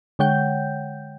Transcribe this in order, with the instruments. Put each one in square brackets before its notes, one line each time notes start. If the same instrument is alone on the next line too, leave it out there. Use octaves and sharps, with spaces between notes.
[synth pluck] D3 G#3 C#5 F#5 G5 G6